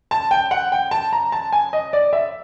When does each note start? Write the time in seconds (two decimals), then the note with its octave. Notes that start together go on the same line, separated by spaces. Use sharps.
0.11 A5
0.31 G5
0.51 F#5
0.72 G5
0.91 A5
1.13 A#5
1.32 A5
1.53 G#5
1.73 D#5
1.93 D5
2.13 E5